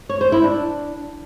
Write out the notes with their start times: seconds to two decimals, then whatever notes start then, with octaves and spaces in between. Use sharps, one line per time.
0.09 C#5
0.21 C5
0.32 E4
0.44 D4